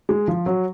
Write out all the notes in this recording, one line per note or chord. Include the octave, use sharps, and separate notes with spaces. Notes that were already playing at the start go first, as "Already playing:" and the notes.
G#3
F3
F#3